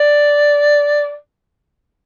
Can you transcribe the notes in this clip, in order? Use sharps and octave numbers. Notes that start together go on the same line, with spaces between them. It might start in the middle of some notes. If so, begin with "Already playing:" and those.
Already playing: D5